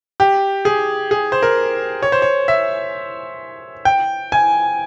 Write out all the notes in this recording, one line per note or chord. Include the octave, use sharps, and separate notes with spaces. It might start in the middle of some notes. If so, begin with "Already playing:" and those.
G4
G#4
G#4
C5
A#4
C#5
C5
C#5
E5
G5
G#5